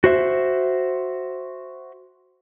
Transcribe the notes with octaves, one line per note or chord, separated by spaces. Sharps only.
F#4 C5 E5